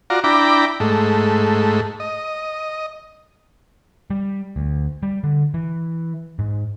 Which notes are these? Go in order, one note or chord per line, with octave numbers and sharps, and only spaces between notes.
F4 F#4 D5 A#5
D4 E4 G5 A#5 B5 D6
G#2 A3
D#5
G3
D2
G3
D3
E3
G#2